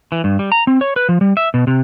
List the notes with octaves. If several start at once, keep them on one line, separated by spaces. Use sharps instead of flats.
E3
G2
G3
A#5
C4
C#5
B4
F3
G3
E5
B2
C3